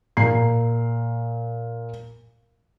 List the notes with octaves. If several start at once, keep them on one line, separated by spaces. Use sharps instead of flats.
A#2 A#5 C7